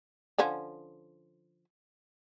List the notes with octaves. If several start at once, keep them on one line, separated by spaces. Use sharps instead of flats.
D3 F3 C#4